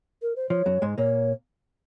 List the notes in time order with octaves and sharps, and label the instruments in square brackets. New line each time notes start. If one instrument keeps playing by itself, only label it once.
[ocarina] A#4
C5
[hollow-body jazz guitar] F3 [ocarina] C#5
[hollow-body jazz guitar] F#2 F#3
G#2 G#3
[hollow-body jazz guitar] A#2 A#3 [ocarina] C#5